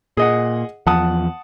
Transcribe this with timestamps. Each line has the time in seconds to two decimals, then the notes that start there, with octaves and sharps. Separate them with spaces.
0.17 A#2 G#4 D#5 F#5
0.87 E2 F3 F#5 A5 D#6